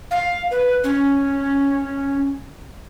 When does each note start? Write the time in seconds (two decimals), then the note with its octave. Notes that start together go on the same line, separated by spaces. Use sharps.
0.11 F5
0.51 B4
0.84 C#4